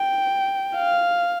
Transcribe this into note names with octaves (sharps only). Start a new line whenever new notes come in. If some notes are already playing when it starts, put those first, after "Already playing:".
Already playing: G5
F5